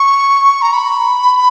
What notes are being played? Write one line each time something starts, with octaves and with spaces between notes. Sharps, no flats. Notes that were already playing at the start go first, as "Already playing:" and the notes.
Already playing: C#6
A#5
B5